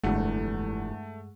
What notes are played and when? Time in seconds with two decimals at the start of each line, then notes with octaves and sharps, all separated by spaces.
0.03 F1 E2 G2 D3 G#3 A3 F#5